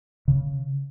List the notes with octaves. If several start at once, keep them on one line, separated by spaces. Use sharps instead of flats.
C#3